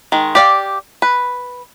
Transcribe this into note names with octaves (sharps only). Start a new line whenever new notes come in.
D#3 G#3
G4 D5 F5
B4